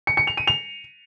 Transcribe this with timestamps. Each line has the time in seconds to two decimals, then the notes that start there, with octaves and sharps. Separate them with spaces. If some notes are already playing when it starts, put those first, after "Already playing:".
0.07 C#7
0.17 C#7
0.27 F7
0.37 D#7
0.47 F7